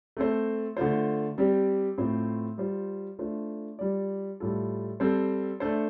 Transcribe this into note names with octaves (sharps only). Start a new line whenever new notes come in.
A3 C4 A4 C5
D3 A3 F4 C5
G3 C4 G4 D5
A2 A3 C4 F4 C5
G3 F4 C5
A3 D4 F4 C5
G3 F4 D5
A2 G3 F4 A4
G3 C4 A4 C5
A3 D4 A4 C5